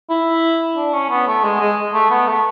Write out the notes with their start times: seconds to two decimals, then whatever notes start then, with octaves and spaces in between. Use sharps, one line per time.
0.10 E4
0.77 D4
0.93 C#4
1.10 B3
1.27 A3
1.44 G#3
1.60 G#3
1.94 A3
2.10 B3
2.27 A3